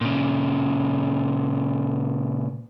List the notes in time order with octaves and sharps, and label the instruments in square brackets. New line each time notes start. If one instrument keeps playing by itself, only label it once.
[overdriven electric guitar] A#2 C#3